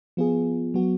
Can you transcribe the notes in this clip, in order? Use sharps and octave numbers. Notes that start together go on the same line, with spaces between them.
F3 B3 F4 G#4
F#3 B3 F#4